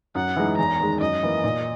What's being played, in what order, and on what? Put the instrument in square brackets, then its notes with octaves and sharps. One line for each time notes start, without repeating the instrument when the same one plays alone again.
[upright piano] F#2 [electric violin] F#5
[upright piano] E3 G#3 D#4
[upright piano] E2 [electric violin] A#5
[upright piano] D#3 G#3
[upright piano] F#2 [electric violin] D#5
[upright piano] E3 A#3
A#2